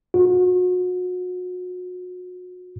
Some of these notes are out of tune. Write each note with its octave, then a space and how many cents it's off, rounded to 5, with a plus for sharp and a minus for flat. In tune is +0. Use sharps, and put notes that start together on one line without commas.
F#4 -35